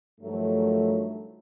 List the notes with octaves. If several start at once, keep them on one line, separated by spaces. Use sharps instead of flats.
G2 D#3 F3 F#3 A3